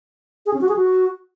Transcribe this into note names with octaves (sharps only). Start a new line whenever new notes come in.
G#4
C#4
F#4
G#4
F#4